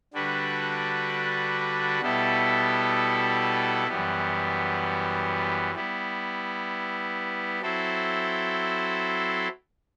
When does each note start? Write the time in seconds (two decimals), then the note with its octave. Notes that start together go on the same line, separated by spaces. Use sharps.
0.13 D3 G3 D4 F#4 B4
2.01 B2 G3 B3 E4 A4
3.88 F#2 E3 G3 B3
5.74 G3 B3 E4
7.61 F#3 C4 E4 A4 C5